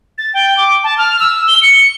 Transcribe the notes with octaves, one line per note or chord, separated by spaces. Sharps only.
A6
G5
D6
A5
F6
E6
G7
C#7